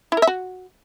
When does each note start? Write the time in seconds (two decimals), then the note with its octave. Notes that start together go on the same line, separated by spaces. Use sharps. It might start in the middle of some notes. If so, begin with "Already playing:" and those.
0.12 E4
0.17 A#4
0.22 E5
0.27 F#4